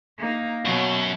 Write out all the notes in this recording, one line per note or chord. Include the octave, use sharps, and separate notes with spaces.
A#3 D#4
F#2 B2 F#3